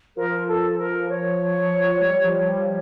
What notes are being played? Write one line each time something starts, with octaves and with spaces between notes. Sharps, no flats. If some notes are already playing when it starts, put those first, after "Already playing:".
F3 A#4
A4
A#4
C#5
F3
G3
F3
G3